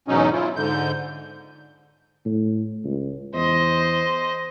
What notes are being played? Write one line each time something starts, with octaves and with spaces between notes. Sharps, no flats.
E2 G#2 B2 F#3 C#4 D#4
E4 F4
G#2 D3 G6
A2
C#2
E2 C5 D#5